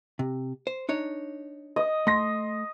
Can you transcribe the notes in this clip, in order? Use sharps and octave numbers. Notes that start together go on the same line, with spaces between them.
C3
C5
D4 D#4 C#5
D#5
A3 C6 A#6